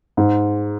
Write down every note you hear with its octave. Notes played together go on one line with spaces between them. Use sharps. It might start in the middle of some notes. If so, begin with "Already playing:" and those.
G#2